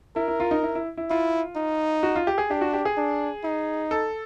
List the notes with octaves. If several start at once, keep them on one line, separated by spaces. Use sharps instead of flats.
E4 A#4
E4
F4
D#4
E4
E4
E4
E4 F4
D#4
F#4
F4
G4
G#4
D4 G4
F#4
G4
G#4
D4
D#4
A4